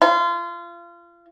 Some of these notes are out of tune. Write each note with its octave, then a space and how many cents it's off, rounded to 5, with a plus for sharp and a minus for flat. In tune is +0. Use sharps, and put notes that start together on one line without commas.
F4 -30